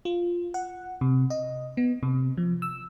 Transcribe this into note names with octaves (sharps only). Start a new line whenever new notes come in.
F4
F#5
C3
D#5
B3
C3
F3
E6